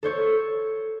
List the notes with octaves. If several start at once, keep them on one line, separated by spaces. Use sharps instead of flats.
A4 C5 C#5